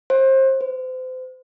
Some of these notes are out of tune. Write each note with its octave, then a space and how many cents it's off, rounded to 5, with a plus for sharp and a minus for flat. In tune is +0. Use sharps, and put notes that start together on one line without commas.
C5 +30
C5 -35